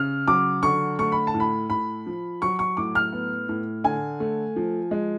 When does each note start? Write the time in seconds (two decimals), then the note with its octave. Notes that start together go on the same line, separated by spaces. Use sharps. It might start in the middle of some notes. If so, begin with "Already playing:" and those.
Already playing: C#3 F6
0.28 F#3 D6
0.63 D3 C#6
0.99 A3 C#6
1.12 B5
1.27 A5
1.34 A2
1.40 B5
1.70 A2 B5
2.07 F3
2.42 F#3 C#6
2.59 C#6
2.77 A2 D6
2.95 F6
3.13 B3
3.49 A2
3.84 D3 G#5
4.20 A3
4.56 F3
4.91 G#3